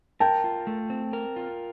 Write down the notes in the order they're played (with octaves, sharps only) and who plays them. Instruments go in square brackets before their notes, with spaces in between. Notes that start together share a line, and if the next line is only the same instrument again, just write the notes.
[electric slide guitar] A#4 [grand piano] G5 A5
[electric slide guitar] F4
A3
C4
A#4
F4